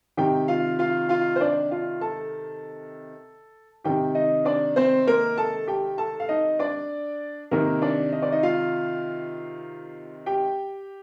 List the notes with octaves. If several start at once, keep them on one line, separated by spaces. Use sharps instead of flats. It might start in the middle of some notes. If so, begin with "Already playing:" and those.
C3 D#3 G4 G5
F4 F5
F4 F5
F4 F5
C5
D4 D5
F4 F5
A4 A5
C3 D#3 G4 G5
D#4 D#5
D4 D5
C4 C5
A#3 A#4
A4 A5
G4 G5
A4 A5
F5
D#4 D#5
D4 D5
C3 D#3 A#3 A#4
D4 D5
D#5
D5
D#4 D#5
F4 F5
G4 G5